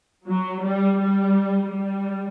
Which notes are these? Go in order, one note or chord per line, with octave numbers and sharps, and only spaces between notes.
F#3
G3
G3
G3